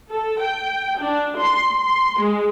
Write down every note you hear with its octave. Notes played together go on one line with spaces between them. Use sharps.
A4
G5
D4
C6
C6
G#3